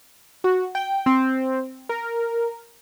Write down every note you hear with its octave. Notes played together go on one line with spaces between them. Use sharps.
F#4
G5
C4
A#4